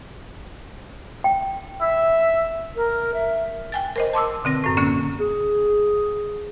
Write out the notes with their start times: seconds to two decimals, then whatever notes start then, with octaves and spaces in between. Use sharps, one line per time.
1.24 G5
1.81 E5
2.76 A#4
3.14 E5
3.72 G5 G#5 A6
3.96 A#4 C5 D#5
4.14 A5 C6 D6 E6
4.44 B2 D3 C4 A#6
4.64 F#2 A2
4.77 D3 A#3 C#4
5.20 G#4